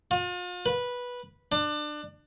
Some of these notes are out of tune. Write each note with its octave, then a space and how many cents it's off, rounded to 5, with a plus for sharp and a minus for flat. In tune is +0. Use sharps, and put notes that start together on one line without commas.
F4 +40
B4 -10
D4 +25